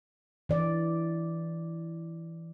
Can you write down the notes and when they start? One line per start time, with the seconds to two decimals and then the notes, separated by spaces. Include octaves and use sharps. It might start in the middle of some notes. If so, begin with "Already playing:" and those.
0.49 E3 D5